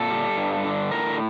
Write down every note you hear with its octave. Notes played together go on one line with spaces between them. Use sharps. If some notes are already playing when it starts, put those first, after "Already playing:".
Already playing: A#2 A4
G3
G2
D3
A2 A#4